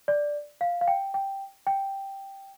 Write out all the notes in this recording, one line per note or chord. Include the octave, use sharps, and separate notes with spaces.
D5
F5
F5
G5
G5
G5